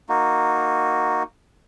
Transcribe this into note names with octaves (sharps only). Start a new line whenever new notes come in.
A#3 D#4 F#4